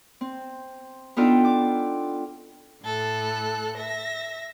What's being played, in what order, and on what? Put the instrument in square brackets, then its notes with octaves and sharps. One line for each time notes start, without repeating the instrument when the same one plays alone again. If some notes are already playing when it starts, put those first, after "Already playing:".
[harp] C4
B3 D4 D#4 F4 A4 G5
D6
[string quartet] A2 A4 F#6
E5 A#6